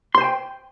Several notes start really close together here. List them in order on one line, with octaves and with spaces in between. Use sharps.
C6 C5 G#5 G5